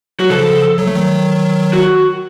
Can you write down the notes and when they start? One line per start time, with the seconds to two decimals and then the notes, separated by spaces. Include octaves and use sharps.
0.19 F#3 F#4
0.30 C#3 F3 A4
0.78 F#3
0.87 A3
0.95 D#3 F#3
1.73 F#4